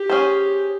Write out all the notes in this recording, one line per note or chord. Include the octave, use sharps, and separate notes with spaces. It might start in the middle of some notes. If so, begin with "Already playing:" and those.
Already playing: G4
C#4 G#4 C5